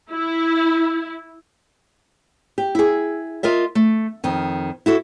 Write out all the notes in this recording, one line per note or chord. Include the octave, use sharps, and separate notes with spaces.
E4
G4
E4 G#4
F4 A#4 D#5 E5
A3
F2 D#3
E4 F#4 A4